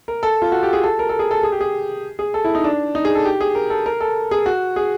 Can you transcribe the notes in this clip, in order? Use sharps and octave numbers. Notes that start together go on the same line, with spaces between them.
A#4
A4
F4
F#4
G4
G#4
A4
A#4
A4
G#4
A4
G#4
G4
G#4
G#4
A4
E4
D#4
D4
D#4
G#4
A4
G4
G#4
A#4
A4
A#4
A4
G#4
F#4
G#4